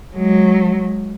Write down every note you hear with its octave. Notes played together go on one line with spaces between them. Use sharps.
F#3 G#3